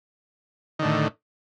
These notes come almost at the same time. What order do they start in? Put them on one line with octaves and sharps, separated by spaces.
D#3 D3 A2